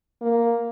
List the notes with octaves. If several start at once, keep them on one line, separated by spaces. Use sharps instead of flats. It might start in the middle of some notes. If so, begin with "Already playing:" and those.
A#3